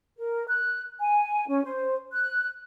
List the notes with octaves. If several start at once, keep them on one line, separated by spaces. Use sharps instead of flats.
A#4
F#6
G#5
C#4
C5
F#6